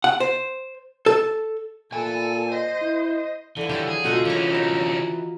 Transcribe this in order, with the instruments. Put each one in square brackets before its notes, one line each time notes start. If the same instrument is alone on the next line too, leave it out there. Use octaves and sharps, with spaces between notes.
[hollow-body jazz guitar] F#5
C5
A4
[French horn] A#2 [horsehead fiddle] A4 [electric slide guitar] E5 G#5
[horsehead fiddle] C5 [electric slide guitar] D#5
[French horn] E4
[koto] D3 F3 [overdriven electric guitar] E3
[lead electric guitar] D3 [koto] F#3 F4 G4
[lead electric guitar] G#4
[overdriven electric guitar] B2 D3 [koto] G#3 D#4 A4 [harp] F4 F#4
[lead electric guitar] D3 C#4 [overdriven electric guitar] E3 [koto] A#3 A#5
[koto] D#4 [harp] A#4